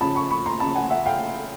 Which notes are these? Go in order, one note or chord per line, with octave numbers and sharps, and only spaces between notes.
C#3 F3 A5 B5
B5 C#6
B5 C#6
A#5 C6
C#3 F3 A5 B5
F#5 G#5
E5 F#5
F5 G5